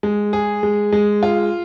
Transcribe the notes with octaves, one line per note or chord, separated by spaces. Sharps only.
G#3
G#4
G#3
G#3
F4